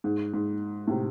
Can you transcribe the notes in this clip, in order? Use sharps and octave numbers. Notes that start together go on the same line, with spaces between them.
G#2
G#2
A2
C3